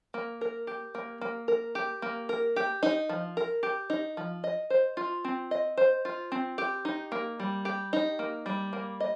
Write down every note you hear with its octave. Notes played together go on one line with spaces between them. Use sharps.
A#3
A#4
G4
A#3
A#3
A#4
G4
A#3
A#4
G4
D#4
F3
A#4
G4
D#4
F3
D#5
C5
F4
C4
D#5
C5
F4
C4
G4
D#4
A#3
G3
G4
D#4
A#3
G3
A#3
D#5